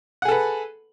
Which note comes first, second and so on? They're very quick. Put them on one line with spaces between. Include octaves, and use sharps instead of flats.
F#5 G#4 A4 B4